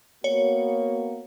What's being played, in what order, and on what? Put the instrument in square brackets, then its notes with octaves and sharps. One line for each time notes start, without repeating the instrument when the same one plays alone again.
[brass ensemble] A#3 B3 F#4 [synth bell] C#5